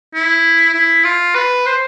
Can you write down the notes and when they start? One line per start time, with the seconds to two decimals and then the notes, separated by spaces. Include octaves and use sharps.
0.15 E4
0.74 E4
1.04 F4
1.35 B4
1.66 C5